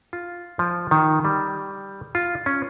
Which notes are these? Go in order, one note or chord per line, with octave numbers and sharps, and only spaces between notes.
F4
F3
D#3
G3
F4
C#4